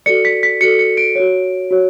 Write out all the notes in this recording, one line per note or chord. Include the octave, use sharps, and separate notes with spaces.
F#4 A4 D5 C#7
B6
B6
F#4 A4 D5 C#7
C#7
D7
F#4 C#5
F#4 C#5